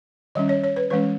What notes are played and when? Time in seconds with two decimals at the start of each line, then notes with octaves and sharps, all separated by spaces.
0.35 D#3 G3 C#4 D#5
0.49 C#5
0.64 C#5
0.76 B4
0.90 E3 G#3 C#4 B4